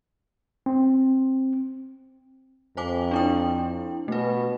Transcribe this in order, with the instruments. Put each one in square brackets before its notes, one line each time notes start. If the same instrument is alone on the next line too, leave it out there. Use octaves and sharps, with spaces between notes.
[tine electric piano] C4
[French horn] F2 [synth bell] C5 G#5 D6
[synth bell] D4 E4 G5
[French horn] B2 [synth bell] A3 B4